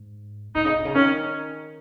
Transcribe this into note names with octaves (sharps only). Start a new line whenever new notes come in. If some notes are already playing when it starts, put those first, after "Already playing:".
Already playing: G#2
A#2 D#4
C#3
A#2
C#3
D#3 C#4